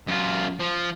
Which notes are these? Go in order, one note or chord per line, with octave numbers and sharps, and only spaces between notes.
F#2 F4
F3